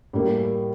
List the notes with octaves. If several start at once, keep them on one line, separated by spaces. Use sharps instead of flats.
A2 G3 A#3